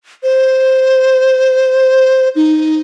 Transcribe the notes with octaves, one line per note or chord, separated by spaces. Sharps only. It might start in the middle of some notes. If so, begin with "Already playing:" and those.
C5
D#4